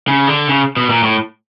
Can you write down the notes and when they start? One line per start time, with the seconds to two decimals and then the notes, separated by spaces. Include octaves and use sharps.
0.08 C#3
0.28 D3
0.49 C#3
0.77 B2
0.90 A#2
1.03 A2